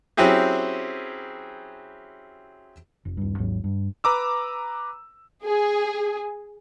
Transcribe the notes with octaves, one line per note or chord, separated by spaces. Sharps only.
F#3 C4 C#4 E4 G4 G#4
F1
D#1 G2
G#1 D#2 G#2 F#3
G2
B4 A#5 D6 E6
G#4